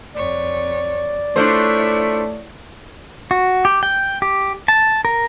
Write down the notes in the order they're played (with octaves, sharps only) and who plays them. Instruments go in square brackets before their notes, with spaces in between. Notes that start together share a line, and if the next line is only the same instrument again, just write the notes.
[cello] F2 C#5 [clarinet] D5
[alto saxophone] A3 [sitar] D4 F4 C5 [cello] E4 C#5
[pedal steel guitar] F#4
G4
G5
G4
A5
A#4